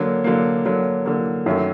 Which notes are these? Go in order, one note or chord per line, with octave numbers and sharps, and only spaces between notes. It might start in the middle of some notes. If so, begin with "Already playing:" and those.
Already playing: D3 F#3 A#3
D3 F#3 A#3
D3 F#3 A#3
D3 F#3 A#3
F#2 D#3 F#3 A3